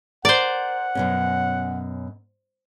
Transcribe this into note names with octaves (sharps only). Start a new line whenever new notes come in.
A#4 C5 D5 F#5
F#2 B2 C#4